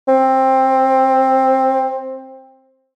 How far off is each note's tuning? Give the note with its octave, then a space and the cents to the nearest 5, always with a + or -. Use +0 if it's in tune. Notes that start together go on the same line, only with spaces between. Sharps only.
C4 +15